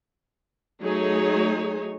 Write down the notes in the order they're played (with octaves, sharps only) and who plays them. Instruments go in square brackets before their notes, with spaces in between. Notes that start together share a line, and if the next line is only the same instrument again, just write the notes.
[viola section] F#3 A3 D#4 G#4 C#5